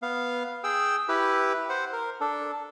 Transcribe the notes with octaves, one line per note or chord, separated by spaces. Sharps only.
B3 F5
G#4 G5 E6
E4 G4 B4
C5 F#5
A#4
D4 A4